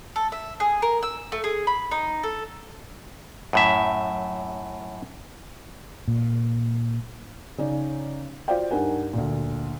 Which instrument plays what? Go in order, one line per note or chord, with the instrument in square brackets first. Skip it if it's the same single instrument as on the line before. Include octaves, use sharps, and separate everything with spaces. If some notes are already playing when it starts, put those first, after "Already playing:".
[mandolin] A4
E5
G#4
A#4
E6
A3
G#4
B5
D#4
A4
[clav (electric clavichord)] F#2 A2 E5
[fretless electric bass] A#2
[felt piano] C#3 C#4 D#4 D5
F4 F#4 C5 D5 F5 G5
G2 D#4 A#4 F#5 G#5
D2 A#2